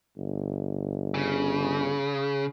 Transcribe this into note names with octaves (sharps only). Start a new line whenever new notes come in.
G1
C#3